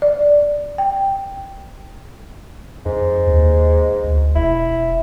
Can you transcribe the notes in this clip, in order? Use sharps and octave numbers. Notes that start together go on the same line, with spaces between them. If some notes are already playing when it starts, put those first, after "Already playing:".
D5
G5
F2 G#2
D#2
D2
E1 E4